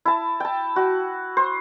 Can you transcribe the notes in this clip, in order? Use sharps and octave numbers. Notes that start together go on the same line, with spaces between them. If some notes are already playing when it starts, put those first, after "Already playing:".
E4 A5
G5 A5
F#4
C5